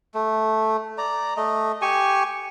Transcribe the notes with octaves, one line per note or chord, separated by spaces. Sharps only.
A3
D5 A#5
A3 D#5
G4 G#5 C#6